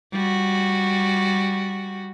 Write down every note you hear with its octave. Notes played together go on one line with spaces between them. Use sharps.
G3 F#4